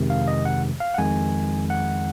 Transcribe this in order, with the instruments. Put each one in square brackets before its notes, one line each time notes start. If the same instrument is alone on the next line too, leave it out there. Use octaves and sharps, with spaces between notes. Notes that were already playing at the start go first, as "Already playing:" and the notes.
Already playing: [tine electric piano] F2 C3 D#3 G#3
F5
D#5
F#5
F5
F#5
F2 D#3 G#3 G#5
F#5